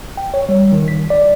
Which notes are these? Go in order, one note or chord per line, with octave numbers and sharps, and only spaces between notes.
G5
C#5
G3
D#3
B6
D5